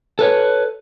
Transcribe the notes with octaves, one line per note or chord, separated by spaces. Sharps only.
A4 B4 C#5